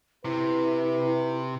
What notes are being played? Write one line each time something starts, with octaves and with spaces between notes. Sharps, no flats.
C3 E4 B4